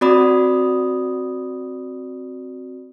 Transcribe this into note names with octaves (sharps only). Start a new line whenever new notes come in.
C4 F#4 D5 B5 D#6